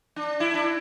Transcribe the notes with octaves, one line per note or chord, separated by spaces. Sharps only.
D4
E4
D4